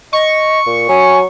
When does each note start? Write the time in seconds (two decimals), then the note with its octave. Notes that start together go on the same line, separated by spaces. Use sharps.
0.13 D#5 C#6
0.66 A#2
0.89 F#3 G#5